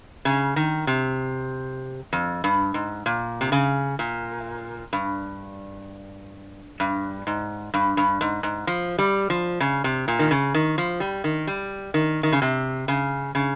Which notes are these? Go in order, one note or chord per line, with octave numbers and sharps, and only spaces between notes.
C#3
D#3
C3
F2
G2
G#2
A#2
C3
C#3
A#2
G2
G2
G#2
G2
G2
G#2
G#2
F3
G3
F3
C#3
C3
A#2
D#3
C#3
D#3
F3
G3
D#3
G3
D#3
D#3
C#3
C3
C#3
C#3